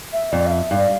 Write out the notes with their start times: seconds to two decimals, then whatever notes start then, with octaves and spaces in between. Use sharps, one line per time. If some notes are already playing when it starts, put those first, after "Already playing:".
0.13 E5
0.32 F2 D5
0.47 F5
0.51 E5
0.71 G2 F5